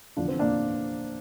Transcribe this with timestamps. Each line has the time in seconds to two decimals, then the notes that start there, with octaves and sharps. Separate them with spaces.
0.17 F1 E2 D3 D4 F4
0.28 C4
0.39 A#3 D4